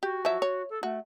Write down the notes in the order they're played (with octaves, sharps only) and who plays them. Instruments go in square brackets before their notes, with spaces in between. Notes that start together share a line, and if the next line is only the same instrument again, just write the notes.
[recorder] F#4 [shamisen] G4
[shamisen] F3 F#3 E5
C#5
[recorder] A4
[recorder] A3 [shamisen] F#4